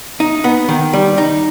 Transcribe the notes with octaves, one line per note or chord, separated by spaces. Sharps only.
D#4
B3
D#3
G3
D#4